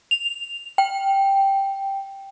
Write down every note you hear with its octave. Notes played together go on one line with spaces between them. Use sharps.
F7
G5